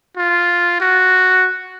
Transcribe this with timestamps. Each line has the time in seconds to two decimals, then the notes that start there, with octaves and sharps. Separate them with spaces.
0.17 F4
0.81 F#4